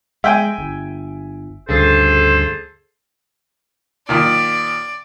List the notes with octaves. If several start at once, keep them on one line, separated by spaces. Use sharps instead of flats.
G#3 E5 G5 G#5
G1
D2 G2 C#3 G#4 A4 C5
A#2 D#3 D5